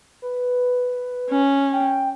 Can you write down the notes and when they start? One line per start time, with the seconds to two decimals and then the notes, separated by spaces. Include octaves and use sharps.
0.22 B4
1.30 C#4
1.72 G5